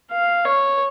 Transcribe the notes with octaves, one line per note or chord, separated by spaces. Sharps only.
F5
C#5